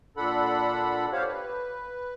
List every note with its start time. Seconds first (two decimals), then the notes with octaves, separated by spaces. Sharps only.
0.17 A#2 D4 A4 F#5 B5
1.12 G4 C5 C#5 F5
1.27 B4